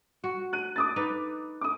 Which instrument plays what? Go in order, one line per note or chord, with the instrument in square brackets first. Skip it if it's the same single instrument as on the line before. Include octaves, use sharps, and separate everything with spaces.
[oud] F#4
[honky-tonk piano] F#6 D#7
D6 D#6 A6
[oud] D#4 B4
[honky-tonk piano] D6 D#6